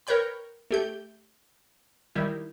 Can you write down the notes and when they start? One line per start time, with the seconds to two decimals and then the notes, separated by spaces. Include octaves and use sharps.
0.07 A#4 B4 C#5 G5 B5
0.71 A3 G4 G6
2.15 D#3 G3 E4